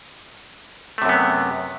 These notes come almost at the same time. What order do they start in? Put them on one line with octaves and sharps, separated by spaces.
A3 C3 F#2 B3